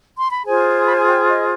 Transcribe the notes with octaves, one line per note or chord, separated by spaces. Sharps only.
C6
B5
F4 G#4 C5 G#5
G#5
B5
G#5
G5
D#5